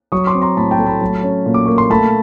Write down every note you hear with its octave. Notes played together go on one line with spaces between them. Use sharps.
F#3 C#6 D#6
C6 D6
C4
A#5 C6
A2 A5 B5
G5 A5
A3
A5 B5
F#3
C#4
A#2
D6
A#3 C#6
C6
A3 A5 B5